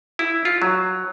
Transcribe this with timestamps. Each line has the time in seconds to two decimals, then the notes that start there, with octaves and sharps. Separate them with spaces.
0.19 E4
0.45 F4
0.62 F#3